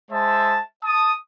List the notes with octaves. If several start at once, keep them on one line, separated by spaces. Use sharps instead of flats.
G#3 C5 E5 A5
A5 D#6